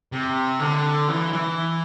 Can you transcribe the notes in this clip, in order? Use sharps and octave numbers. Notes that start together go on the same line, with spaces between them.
C3
D3
E3
E3